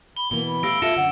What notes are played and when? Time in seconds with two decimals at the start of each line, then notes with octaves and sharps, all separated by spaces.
0.17 B5 G7
0.31 B2 E3 A#3 G7
0.47 B5
0.63 A3 G4 F5 E6 A#6 D7
0.82 F4 A4 E5 A#6 C#7 E7
0.96 F#2 D3 F#5